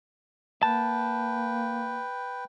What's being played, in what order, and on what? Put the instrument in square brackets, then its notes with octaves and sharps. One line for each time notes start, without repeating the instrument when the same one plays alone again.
[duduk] A#3 [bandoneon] B4 G5 [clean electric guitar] A5